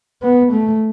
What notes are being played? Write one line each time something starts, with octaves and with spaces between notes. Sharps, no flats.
B3
A3